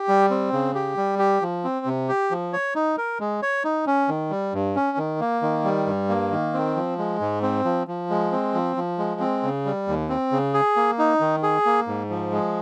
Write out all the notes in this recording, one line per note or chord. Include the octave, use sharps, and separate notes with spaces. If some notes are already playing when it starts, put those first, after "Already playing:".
Already playing: G4
G3
C4
C#3
G4
G3
G4
F3
C4
C3
G4
F3
C#5
D#4
A#4
G#3
C#5
D#4
C#4
D#3
G3
G2
C#4
D#3
A#3
D#3
G3
G2
A#3
D#3
C4
F3
G#3
G#2
C4
F3
F3
G#3
C4
F3
F3
G#3
C4
C#3
G3
D#2
C4
C#3
G#4
A#3
D#4
D#3
G#4
A#3
G#2
F3
G#3